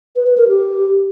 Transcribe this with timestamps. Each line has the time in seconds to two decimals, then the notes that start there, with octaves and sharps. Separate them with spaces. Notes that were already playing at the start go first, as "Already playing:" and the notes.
0.16 B4
0.27 B4
0.37 A#4
0.48 G4